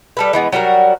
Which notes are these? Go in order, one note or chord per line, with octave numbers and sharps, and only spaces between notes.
G3 A4 B4
E3 G#3 B3
F#3 G3 F#4 A#4